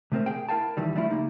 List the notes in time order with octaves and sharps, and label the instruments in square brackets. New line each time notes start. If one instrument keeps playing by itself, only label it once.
[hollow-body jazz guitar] C3 A3 C4 A#4 C5
G#4 G5
E4 A#4 F5 G5 A5
C2 D#3 E3 G3
F#3 G3 A3 D4 E4 F4
C#2 A#3 D#4